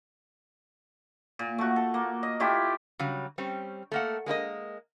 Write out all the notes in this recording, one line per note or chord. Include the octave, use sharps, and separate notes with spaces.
A#2
A3 F#4
A4
A#3
D#5
A3 E4 F4 G4
C#3 F#3 G3
G3 C4 C#4
A3 A#3 F#5
G#3 A#3 E4 D#5